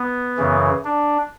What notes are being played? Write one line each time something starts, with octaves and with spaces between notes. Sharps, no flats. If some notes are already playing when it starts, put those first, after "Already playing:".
Already playing: B3
F#2 C#3 E3
D4